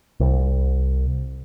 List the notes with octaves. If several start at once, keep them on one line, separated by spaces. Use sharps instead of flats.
C2